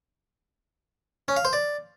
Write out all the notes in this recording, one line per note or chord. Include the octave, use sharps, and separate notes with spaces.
C#4
F5
C5
D5